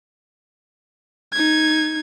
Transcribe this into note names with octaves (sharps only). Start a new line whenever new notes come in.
D#4 G#6